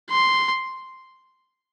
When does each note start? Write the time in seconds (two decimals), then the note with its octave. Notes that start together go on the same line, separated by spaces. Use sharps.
0.10 C6